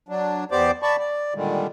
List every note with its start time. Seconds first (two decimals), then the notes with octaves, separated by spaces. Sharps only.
0.09 F#3 D4
0.52 E2 B3 G4 C5 D5 D6
0.82 D5 A5 B5 C#6
0.99 D5
1.35 A#2 D3 D#3 G3 G#3